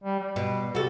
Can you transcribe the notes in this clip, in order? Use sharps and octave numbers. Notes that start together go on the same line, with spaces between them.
G3
G3
B2
C3 F#4 A4